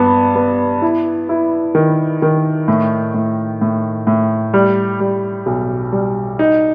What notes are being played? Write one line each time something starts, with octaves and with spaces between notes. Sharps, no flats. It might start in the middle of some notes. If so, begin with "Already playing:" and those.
Already playing: G2 B3
B3
E4
E4
D#3
D#3
A2
A2
A2
A2
G3
G3
B1
G3
D#4